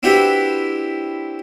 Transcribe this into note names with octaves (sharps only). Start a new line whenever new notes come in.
C4 D4 E4 F#4 G4 B4